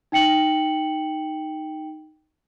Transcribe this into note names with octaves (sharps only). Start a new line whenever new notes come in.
D#4 G5 C#7 F#7